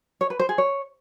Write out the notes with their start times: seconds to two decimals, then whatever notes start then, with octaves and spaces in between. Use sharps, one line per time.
0.21 C#5
0.30 B4
0.39 C5
0.49 G#4
0.58 C#5